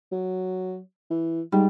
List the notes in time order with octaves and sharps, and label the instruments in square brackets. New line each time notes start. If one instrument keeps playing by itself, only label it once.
[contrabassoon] F#3
E3
[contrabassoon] G#2 [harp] G3